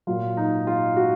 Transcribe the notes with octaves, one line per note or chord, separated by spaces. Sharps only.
A#2 F#3 F4
D#4
F4
F#4